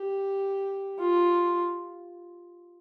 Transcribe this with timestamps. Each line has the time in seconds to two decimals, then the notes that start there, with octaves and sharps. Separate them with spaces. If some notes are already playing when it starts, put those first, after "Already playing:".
Already playing: G4
0.99 F4